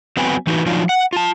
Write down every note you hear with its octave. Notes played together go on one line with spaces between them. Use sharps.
F#3 B3 C4 B4 G5 G#5
E3 D#4 F#4 A#4 B4
F3 F#3 D4 D#4 F4
F#5
F4 A5